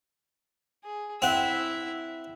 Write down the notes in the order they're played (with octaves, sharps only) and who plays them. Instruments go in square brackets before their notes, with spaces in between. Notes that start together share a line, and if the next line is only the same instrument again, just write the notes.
[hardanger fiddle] G#4
[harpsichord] C4 F#5 [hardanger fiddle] E4 E5